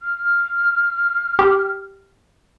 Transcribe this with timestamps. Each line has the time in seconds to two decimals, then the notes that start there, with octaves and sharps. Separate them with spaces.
0.01 F6
1.39 G4